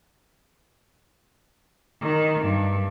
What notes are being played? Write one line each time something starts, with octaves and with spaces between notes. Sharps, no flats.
D#3
G2